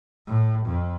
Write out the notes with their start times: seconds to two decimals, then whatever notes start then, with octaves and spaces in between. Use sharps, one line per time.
0.27 A2
0.66 F2